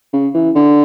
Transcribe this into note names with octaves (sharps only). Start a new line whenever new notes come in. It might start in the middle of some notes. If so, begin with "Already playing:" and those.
C#3
E3
D3